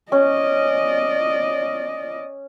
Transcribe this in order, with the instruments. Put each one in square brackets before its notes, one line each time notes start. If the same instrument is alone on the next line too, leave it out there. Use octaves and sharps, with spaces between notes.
[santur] C#4 [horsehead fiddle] D5 D#5